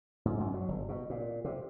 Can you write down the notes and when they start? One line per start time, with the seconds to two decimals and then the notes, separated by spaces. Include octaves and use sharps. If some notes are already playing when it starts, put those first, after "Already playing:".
0.25 G#2
0.40 F#2
0.54 F#3
0.68 G1
0.89 B2
1.10 A#2
1.45 C3